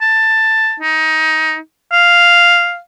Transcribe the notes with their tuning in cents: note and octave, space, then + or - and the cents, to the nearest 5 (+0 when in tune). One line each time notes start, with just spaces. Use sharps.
A5 +10
D#4 +20
F5 +0